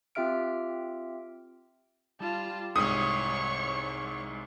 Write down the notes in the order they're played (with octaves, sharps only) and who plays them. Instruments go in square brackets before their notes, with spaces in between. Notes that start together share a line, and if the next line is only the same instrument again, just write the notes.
[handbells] C4 F4 G4 E5 F6 D7
[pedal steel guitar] G3 [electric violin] F4 A5
[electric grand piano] C2 G#2 [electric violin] C#5 C#6 [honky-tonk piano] D#6